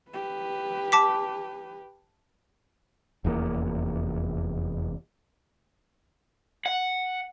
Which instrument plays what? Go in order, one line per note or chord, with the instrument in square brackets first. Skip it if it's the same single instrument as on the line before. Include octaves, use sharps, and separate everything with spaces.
[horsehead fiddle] G4 B4
[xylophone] A5 D6 B6
[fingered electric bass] F1 E2 A2 A#3
[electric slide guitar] F#5